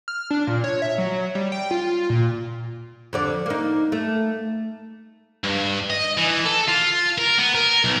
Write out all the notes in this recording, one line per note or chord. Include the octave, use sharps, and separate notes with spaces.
F6
D4
A#2
C#5
E5
F#3
G3
G5
F4
A#2
F2 D3 D5
A#3 D#4
A3
G2
D#5
E3
A4
F4
A#4
B3
A#4
B1